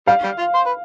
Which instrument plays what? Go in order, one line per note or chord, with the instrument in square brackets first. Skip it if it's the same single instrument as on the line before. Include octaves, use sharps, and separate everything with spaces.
[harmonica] G3 [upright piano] F5
[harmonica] G3
F4
C5
B4